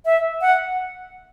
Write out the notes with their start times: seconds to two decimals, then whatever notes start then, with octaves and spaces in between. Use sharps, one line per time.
0.05 E5
0.41 F#5